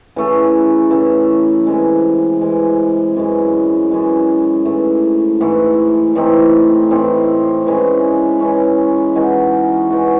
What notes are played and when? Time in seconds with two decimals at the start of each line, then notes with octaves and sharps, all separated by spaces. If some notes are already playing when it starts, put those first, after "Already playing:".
0.16 C#3 E3 A3
0.91 C#3 E3 A3
1.67 C3 E3 G#3
2.41 C3 E3 G#3
3.16 F#2 E3 G#3
3.91 F#2 E3 G#3
4.65 G#2 E3 A3
5.41 G#2 E3 A3
6.15 A2 E3 C4 D#4
6.91 A2 E3 C4 D#4
7.66 E3 G#3 C#4
8.40 E3 G#3 C#4
9.15 E3 G#3 D#4 F#4
9.90 E3 G#3 D#4 F#4